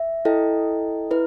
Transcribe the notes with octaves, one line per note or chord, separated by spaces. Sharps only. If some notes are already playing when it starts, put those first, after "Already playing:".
Already playing: E5
E4 A4 D#5 G5
E4 B4